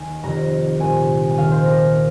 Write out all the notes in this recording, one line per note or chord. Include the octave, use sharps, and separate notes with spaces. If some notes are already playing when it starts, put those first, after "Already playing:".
Already playing: D#2 D#3 G#5
F1 F2 D#3 A#5
C2 A#2 G#5
G#5
D#2 D#3 F5
C5
A#4